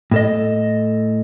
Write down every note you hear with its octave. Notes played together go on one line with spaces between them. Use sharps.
A2 A4 D#5